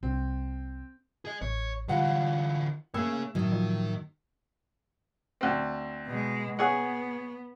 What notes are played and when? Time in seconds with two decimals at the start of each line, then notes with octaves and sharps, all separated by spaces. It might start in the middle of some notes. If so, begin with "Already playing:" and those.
0.03 C2 C4
1.25 G#4 D#5
1.42 A1 C#5
1.88 D3 E3 G3 F4 F#5
2.94 A3 A#3 C#4 G#4 C#5 E6
3.35 A2 D#3 F#3 D#4
3.52 F3
5.41 D2 C4
6.07 B2 G#3
6.59 B3 G#4 C#5 F#5